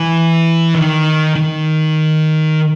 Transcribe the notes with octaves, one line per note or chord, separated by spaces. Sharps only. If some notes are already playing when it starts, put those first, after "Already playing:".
Already playing: E3
D#3
D#3